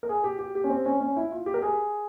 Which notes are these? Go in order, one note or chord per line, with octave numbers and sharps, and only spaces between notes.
A#4
G#4
G4
G4
G4
C#4
C4
C#4
C#4
E4
F4
G4
A#4
G#4